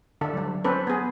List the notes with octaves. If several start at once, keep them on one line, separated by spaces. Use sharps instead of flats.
D3 D4 A4
F#3 G3
C4 C#4 A4 B4
B3 G#4